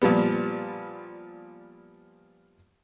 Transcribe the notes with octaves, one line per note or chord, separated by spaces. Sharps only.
A#2 F3 G3 B3